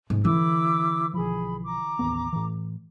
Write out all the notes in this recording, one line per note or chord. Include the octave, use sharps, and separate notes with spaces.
G#2
D3 E3 E4 D6 E6
B1 F3 G#4 B5
A#5 D6
A1 D#2 B3
A2 E3